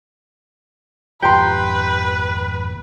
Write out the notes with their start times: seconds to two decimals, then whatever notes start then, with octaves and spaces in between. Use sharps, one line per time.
1.22 G#1 F2 G4 B4 G5 A#5 C6